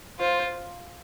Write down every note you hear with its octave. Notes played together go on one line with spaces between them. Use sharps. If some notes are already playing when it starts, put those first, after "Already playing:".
F4 C5